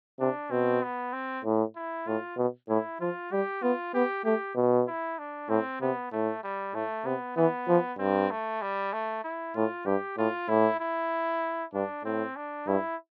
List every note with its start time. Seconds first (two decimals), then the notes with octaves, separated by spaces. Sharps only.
0.20 C3 D4
0.51 B2 C4
0.82 B3
1.13 C4
1.45 A2
1.76 E4
2.07 A2 F4
2.37 B2
2.69 A2 E4
3.00 F3 F4
3.32 G3 G4
3.62 B3 F4
3.94 B3 G4
4.25 A3 G4
4.56 B2
4.88 E4
5.19 D4
5.49 A2 C4
5.81 C3 B3
6.12 A2 A3
6.44 G3
6.74 A2 A3
7.05 C3 B3
7.37 E3 B3
7.68 F3
7.99 G2 C4
8.30 A3
8.62 G3
8.93 A3
9.24 E4
9.55 A2 F4
9.86 G2 G4
10.18 A2 F4
10.49 A2 E4
10.80 E4
11.74 G2 D4
12.04 A2 C4
12.36 D4
12.67 G2 E4